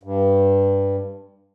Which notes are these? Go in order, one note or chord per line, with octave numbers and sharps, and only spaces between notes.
G2